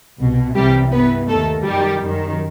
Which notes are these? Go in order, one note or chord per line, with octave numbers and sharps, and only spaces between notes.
C2 B2
C2 C3 E3 G3 G4
G2 E3 B3 B4
D#2 D#3 A3 A4
F#2 D#3 G3 G4
F#2 D#3